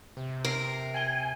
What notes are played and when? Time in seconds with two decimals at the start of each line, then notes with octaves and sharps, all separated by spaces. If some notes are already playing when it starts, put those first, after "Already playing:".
0.17 C3
0.45 A#4 C7 D7
0.94 G5 G#5 G#6 G7